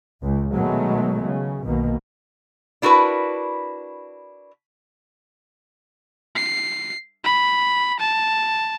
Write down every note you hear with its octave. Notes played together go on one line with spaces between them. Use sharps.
C#2
B2 D#3 F#3 G#3 A3 B3
C#3
B1 B2 D#3 A#3 B3
D4 E4 F#4 A#4 B4
C7
B5
A5